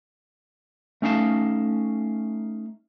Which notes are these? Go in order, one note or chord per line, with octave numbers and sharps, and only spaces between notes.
A3 C#4 D#4 F5 A5